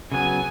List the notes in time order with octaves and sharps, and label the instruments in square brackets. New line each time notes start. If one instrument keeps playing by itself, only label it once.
[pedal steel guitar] C#3 F#3 B3 [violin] G#5